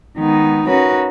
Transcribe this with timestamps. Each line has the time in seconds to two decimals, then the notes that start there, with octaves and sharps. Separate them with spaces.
0.16 D#3 G#3 B3 D#4
0.66 C#4 D#4 F#4 A#4 B4 C#5